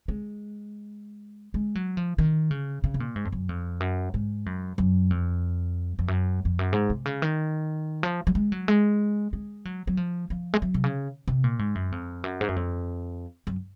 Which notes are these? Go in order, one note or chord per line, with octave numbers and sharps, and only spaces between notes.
G#3
G#3
F#3
F3
D#3
C#3
C#3
C3
A#2
G#2
F2
F#2
F2
F#2
G#2
F#2
F#2
F2
F2
F#2
F2
F#2
G#2
C3
C#3
D#3
F3
F#3
G#3
F#3
G#3
G#3
F#3
F#3
F3
F3
G#3
F#3
C3
C#3
C3
A#2
G#2
F#2
F2
F#2
G#2
F#2
F2
F#2